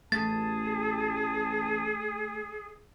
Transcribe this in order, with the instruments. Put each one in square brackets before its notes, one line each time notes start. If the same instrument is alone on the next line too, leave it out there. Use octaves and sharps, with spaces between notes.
[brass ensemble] A1 A5 [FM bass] A3 [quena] G#4 [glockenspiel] A6